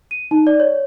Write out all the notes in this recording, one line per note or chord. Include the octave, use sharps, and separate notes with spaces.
D#7
D#4
D5
C#5